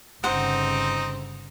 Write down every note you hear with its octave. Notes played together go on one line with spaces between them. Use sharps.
G1 C#3 C4 D#4 C5 F#5